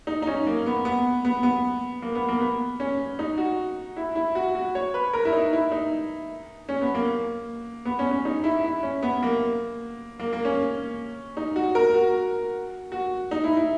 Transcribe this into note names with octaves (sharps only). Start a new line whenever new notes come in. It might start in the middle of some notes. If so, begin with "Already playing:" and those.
D#4
D#4
C#4
A#3
B3
B3
B3
B3
A#3
B3
A#3
B3
C#4
D#4
F#4
E4
E4
F#4
F#4
C#5
B4
A#4
E4
D#4
E4
D#4
C#4
B3
A#3
B3
C#4
C#4
D#4
E4
E4
C#4
B3
A#3
A#3
A#3
C#4
D#4
F#4
A#4
F#4
F#4
D#4
E4
E4